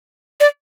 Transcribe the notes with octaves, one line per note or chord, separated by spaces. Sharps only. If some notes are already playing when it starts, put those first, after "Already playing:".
D5